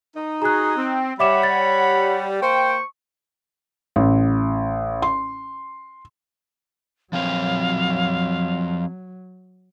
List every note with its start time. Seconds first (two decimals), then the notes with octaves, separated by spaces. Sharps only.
0.16 D#4
0.42 F#4 G#4 A#5 F#6
0.77 C4
1.20 G3 C#5 E5 F#5 B5 D6 E7
1.43 A6
2.42 A#3 C5 G5 C#6
3.96 A1
5.02 C6
7.13 F3 F#3 C4 C#5 F5